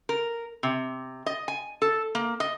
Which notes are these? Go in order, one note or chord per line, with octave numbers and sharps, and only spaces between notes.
A#4
C3
D#5
G#5
A4
A#3
D#5